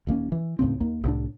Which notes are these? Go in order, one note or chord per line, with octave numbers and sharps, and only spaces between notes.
D#1 D#2 A#3 C#4
E3
D#2 A2 C#3 C4
D#2 A#3
C2 A2 D4